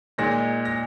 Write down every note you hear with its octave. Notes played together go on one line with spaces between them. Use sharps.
A#2 G#3 D#4 A#6
A#6